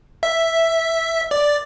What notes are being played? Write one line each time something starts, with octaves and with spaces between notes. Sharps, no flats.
E5
D5